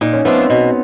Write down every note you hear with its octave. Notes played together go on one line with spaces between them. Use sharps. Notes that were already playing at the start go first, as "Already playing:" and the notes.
A#2 D#4
C#4
F3 A3 B3 D4 F4
C4
B2